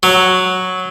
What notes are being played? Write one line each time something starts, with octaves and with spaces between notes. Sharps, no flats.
F#3